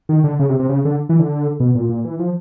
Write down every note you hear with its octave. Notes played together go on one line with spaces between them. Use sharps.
D#3
D3
C#3
C3
C3
C#3
D3
E3
D3
B2
A#2
A#2
E3
F3